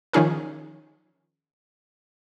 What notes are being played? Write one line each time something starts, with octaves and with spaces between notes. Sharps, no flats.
D#3 F3 C#4 D#4 G#4 A#4